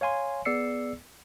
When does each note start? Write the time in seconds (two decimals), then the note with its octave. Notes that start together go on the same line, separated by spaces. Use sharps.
0.01 C#5 F5 G#5 C6
0.45 B3 G#4 D5 E6 C7 C#7